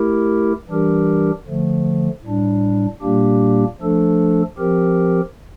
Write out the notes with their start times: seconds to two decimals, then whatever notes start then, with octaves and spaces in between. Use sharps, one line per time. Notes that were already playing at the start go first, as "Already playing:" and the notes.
Already playing: A3 E4 G4 A#4
0.68 E3 G3 D4 G4 A#4
1.46 D3 F3 A3
2.24 A2 G3 D4
3.02 A#2 G3 A#3 D4 G4
3.80 F3 A3 D4 A4
4.58 F3 C4 G4 A#4